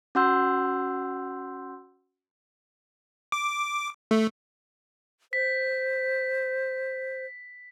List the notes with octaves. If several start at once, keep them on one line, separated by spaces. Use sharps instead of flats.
C#4 F#4 F#5 C6 E6 G6
D6
A3
C5 B6